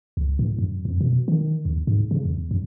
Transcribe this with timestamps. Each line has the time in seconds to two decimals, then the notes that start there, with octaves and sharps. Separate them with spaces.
0.17 C#2
0.39 A2
0.58 F#2
0.85 F2
1.01 B2
1.28 D#3
1.65 D#2
1.87 G#2
2.11 C#3
2.25 E2
2.51 F#2